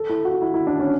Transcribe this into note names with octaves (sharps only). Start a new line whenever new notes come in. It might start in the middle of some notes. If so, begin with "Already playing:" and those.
Already playing: A4
E4
F#4
E4
E4
D4
C#4